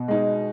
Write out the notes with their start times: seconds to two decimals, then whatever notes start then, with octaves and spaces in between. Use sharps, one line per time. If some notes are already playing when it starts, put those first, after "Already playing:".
Already playing: B2
0.08 G#3 D#4